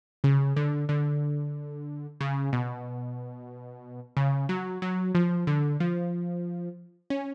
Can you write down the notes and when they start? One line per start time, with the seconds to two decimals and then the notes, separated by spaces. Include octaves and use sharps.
0.24 C#3
0.56 D3
0.89 D3
2.21 C#3
2.53 B2
4.17 C#3
4.49 F#3
4.82 F#3
5.15 F3
5.47 D3
5.80 F3
7.10 C#4